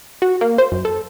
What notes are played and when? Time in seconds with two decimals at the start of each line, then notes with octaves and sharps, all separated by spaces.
0.22 F#4
0.41 A#3
0.58 C5
0.72 F#2
0.85 A4